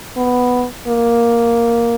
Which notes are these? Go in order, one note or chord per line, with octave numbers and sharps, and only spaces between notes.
B3
A#3